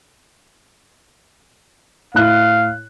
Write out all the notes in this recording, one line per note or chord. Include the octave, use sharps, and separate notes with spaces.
A2 E4 F5 F#6